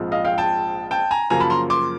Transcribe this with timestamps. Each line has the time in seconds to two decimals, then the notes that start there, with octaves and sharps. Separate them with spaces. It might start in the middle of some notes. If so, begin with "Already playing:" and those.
Already playing: A#1 G#2 F3 G#3 C4
0.12 D#5 F5
0.25 F5 G5
0.38 G5 A5
0.91 G5 A5
1.11 G#5 A#5
1.30 F#2 C#3 F3 A#3 G#5 A#5
1.40 A5 B5
1.50 A#5 C6
1.70 C6 D6